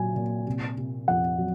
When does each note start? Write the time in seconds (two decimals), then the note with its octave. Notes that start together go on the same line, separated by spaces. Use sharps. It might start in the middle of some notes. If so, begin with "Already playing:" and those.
Already playing: A#2 F#3 G#5
0.16 A#2
0.46 C3
0.78 C3
1.08 F2 F#5
1.39 F#3